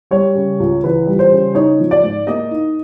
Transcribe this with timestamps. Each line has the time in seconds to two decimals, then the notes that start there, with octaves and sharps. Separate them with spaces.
0.11 G3 C#5
0.35 C#3
0.60 C#2
0.83 E3 B4
1.07 G3
1.19 C5
1.31 C#3
1.55 D#4 C#5
1.80 F3
1.91 D5
2.03 G#2
2.27 A#3 D#5
2.51 D#4